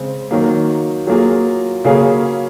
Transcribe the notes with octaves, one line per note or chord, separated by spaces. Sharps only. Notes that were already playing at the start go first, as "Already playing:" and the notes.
Already playing: C#3 G#3 C4
D#3 F#3 A#3
F#3 A#3 F4 G#4
C#3 F#3 A#3 C#4 G#4